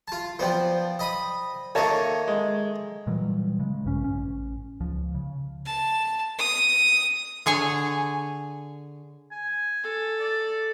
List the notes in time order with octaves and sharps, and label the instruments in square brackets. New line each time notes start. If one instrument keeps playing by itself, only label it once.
[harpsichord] F4 A5
[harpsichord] F3 B3 [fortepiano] C5 D5 G5
[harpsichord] D#5 B5 D#6
[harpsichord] D#3 A3 A#3 [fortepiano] C#5 D#5 A5
[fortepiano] G#3
[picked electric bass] A#2 E3 F#3 G3
C#3 G#3
A#1 G2 D3 C#4
A1 C#4
C#2 F3
C#3
[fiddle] A5
D#6
[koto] D3 G#4 C#5 G#5
[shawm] G#5
[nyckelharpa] A4
[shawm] D5